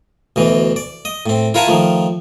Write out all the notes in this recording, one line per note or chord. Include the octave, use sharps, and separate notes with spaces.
D2 B2 E3
D5
D#5
A2 C4
E4 F4 A#4 F#5 G#5 A5
D#3 F3 A3